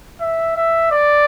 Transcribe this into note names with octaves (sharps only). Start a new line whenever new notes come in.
E5
E5
D5